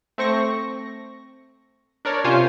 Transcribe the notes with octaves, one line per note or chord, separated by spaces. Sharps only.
A3 C4 C#6 A#6
D4 A#4 C#5 D5
C3 C#4 F4 C5 G#5 C7